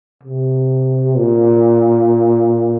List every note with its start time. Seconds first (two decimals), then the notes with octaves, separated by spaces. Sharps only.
0.23 C3
1.17 A#2